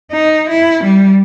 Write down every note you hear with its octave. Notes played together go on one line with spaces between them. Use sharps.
D#4
E4
G3